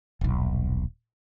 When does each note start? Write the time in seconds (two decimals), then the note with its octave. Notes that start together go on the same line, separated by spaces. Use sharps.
0.21 D#1 B1